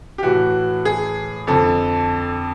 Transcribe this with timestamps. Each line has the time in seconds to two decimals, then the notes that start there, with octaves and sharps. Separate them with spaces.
0.18 G4
0.22 A2 E3 F#4
0.85 G#4
1.47 F2 D3 A4